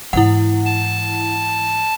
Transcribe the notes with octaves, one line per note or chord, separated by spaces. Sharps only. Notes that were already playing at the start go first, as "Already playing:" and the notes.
G#2 E3 E4 F#5
A5